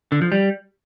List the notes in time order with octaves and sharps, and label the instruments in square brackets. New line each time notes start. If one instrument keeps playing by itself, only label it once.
[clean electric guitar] D3
F3
G3